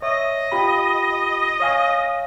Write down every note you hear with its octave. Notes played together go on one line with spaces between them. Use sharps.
C#5 D#5 E5
F4 G4 B5
C#5 F5 G#5